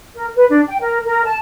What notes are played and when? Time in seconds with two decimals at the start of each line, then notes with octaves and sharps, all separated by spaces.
0.15 A#4
0.35 B4
0.48 D4
0.68 G5
0.81 A#4
1.05 A#4
1.26 A5